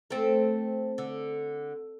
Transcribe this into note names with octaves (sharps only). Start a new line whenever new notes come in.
A3 C4
D3